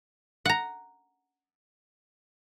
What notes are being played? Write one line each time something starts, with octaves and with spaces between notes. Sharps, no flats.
F#5 A#5